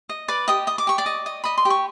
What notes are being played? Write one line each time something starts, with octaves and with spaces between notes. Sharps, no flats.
D#5
B4 D5 D6
G4 D#5 D#6
D#5 D#6
D6
G4 C#6
D5 D6
D#5
D#5
D#5 B5
C6
G4
C#6